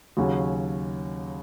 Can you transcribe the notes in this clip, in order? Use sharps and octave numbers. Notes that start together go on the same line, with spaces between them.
D#2 C#3 F#3 C#4 F#4